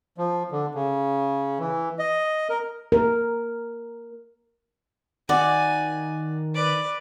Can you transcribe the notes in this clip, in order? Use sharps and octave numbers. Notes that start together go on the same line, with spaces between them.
F3
D3
C#3
E3
D#5
A#4
A#4
D#3 F#4 D5 G#5
B4 D5